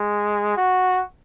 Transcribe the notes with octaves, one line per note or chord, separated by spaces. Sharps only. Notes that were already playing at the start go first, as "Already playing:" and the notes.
Already playing: G#3
F#4